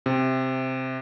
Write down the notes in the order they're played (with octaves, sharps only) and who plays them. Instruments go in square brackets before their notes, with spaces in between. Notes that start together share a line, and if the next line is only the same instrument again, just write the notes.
[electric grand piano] C3